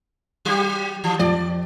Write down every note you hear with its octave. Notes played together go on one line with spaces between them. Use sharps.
F#3 G4
E3
F2 D5